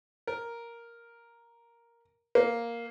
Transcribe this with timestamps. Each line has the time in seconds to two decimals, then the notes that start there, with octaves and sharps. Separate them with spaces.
0.27 A#4
2.35 A#3